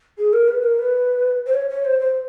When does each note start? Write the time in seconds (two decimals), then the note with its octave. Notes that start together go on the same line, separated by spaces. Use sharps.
0.18 G#4
0.33 A#4
0.48 B4
0.63 A#4
0.79 B4
1.46 C5
1.54 C#5
1.69 C#5
1.85 C5
2.00 C5